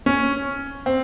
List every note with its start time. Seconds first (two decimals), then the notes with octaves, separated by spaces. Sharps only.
0.06 C#4
0.86 C4